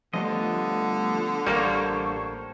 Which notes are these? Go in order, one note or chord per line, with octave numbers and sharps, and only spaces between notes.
D3 F3 G3 A3 B3 F4 D#5
A1 G3 A#3 A4 C5 C#5 C#6